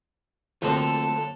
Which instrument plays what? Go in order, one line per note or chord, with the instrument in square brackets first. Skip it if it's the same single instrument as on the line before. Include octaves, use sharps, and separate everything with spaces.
[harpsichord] D3 F#3 A#3 [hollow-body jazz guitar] F3 C4 [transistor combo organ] A3 [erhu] A4